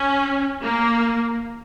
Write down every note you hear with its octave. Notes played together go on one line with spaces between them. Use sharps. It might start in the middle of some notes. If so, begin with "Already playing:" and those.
Already playing: C#4
A#3